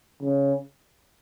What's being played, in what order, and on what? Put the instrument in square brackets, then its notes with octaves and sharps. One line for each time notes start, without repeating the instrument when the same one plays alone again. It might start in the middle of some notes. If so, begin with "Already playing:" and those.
[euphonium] C#3